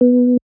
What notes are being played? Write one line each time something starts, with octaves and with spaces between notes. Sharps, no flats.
B3